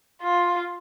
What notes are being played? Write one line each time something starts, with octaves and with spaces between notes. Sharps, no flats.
F4